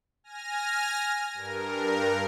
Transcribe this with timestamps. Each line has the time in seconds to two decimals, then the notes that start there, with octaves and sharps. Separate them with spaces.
0.24 G#5 F6 A#6
1.34 G2 A#4